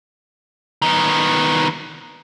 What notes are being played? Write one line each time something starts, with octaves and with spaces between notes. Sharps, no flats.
D#3 B3